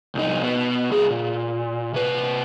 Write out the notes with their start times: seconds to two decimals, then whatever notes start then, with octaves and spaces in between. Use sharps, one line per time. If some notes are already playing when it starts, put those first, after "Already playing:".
0.15 C2 D#4
0.42 B2 B3
0.90 C2 G#4
1.11 A#2
1.94 C3 B4